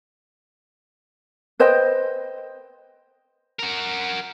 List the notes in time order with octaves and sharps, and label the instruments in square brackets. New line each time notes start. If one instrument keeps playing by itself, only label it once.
[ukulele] B4 C5 D#5 G5
[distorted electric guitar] F#4 A#4